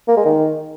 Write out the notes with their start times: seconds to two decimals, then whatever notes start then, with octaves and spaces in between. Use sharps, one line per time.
0.08 A#3
0.17 G#3
0.25 D#3